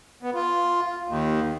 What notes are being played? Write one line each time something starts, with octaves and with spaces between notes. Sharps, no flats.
B3
F4
D#2